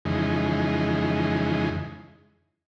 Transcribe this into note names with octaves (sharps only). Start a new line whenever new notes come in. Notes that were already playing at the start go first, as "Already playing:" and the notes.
F2 C#3 E3 G#3 D#4